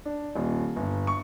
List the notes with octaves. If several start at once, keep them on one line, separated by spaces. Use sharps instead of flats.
D4
D#1
G1
C#6